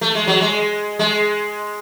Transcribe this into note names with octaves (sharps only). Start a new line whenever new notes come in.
A3
G#3
F#3
G#3
G#3